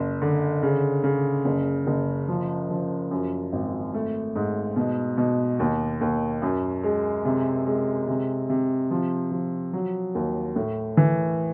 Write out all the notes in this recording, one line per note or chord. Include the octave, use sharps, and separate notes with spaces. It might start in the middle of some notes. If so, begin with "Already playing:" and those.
Already playing: F#1
D3
C#3
C#3
F#1
F#1
F3
F3
F#2
G#1
A3
G#2
B2
B2
D#2
D#2
F#2
G#3
C3
G#3
C3
C3
F3
F3
F#3
D#2
A2
E3